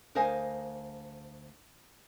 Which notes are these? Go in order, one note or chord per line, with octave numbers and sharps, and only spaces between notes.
D2 A#4 C5 D#5 F5 G#5